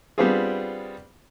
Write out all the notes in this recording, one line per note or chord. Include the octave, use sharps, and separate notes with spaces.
G3 B3 C4 D4 F4 G#4